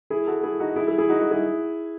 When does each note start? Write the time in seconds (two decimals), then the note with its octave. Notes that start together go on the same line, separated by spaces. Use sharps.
0.10 E4 G#4
0.27 F#4 A4
0.43 E4 G#4
0.60 D#4 F#4
0.76 E4 G#4
0.87 E4 G#4
0.98 E4 G#4
1.09 D#4 F#4
1.20 D#4 F#4
1.31 E4 G#4